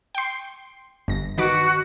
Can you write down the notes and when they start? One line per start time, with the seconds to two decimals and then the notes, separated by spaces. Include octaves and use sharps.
0.15 G5 C6
1.08 G1 A#6
1.38 D#3 F#4 B4 D6